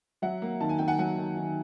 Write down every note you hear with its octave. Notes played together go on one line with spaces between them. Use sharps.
F#3 E5 F#5
A#3
D#3 A5
G#5
D#3 G5
F#5 G#5
F#3 F#5 G#5
D#3
D#3